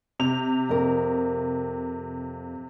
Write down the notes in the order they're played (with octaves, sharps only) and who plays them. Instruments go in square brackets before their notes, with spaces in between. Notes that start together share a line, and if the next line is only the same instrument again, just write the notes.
[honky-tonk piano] C3 F7
[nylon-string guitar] F2 A#4